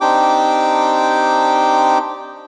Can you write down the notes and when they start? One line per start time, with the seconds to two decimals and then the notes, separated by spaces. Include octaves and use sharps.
0.01 C4 D4 D#4 G4 G5 D6